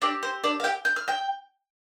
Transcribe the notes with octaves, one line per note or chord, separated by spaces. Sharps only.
C4 D4 G4 D5
C5
D4 D5
F5
G4 G5
G6
F6
G5 G6